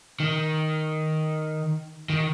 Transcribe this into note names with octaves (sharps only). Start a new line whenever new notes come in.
D#3
D#3